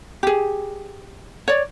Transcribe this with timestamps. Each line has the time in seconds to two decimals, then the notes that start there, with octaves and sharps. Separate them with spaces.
0.23 G4 G#4
1.48 C#5 D5